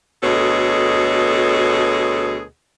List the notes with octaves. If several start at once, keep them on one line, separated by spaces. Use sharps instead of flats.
D2 B2 G#4 A4 C#5 D#5